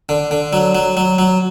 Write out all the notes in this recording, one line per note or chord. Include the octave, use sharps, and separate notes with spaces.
D3
D3
F#3
F#3
F#3
F#3